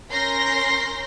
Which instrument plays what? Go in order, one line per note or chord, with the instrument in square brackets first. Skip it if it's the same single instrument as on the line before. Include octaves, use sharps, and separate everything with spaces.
[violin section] C#4 A#4 C6 G6 A#6 C7